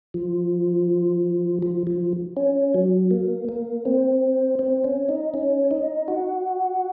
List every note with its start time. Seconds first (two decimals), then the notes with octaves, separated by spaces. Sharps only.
0.14 F3
1.62 F3
1.87 F3
2.37 C#4
2.74 F#3
3.11 A#3
3.49 A#3
3.85 C4
4.59 C4
4.84 C#4
5.09 D#4
5.34 C#4
5.71 D#4
6.08 F#4